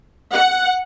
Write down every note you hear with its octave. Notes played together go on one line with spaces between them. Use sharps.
F#5